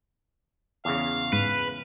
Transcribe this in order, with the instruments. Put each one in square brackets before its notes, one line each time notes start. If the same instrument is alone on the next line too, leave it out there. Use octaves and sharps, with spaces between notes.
[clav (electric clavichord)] E2 C#3 [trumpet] F5
[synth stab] G#2 [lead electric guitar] B4